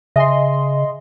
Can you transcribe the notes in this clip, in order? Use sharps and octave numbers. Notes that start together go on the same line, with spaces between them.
C#3 D#5 E5 G#5 C6